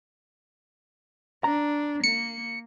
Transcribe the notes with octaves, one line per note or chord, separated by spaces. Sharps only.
D4 A#5
A#3 C#7